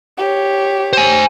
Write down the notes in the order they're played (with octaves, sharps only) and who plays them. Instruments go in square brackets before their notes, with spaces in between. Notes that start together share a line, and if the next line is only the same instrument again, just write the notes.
[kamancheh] G4 C#5
[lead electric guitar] C5 G#5